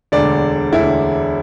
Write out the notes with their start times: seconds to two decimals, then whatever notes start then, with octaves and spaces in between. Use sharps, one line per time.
0.12 E1 D2 D3 D5
0.72 E1 D2 D3 E4